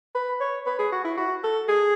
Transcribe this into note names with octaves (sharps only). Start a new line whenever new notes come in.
B4
C#5
B4
G#4
F#4
E4
F#4
A4
G#4